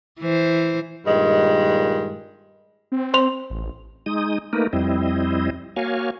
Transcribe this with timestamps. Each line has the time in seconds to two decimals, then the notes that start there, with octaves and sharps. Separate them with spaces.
0.19 E3 C5
1.06 G2 A#2 D#3 G#3
2.92 C4
3.14 C5 C6 F7
3.50 A1
4.06 G#3 D#4 D#6
4.53 A3 A#3 D#4 A#4 B4
4.73 F2 G3 C4 E4 D#5
5.76 A#3 F#4 C#5 F5 G#5